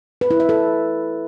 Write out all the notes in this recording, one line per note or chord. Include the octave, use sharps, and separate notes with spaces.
B4
E4
E5
A4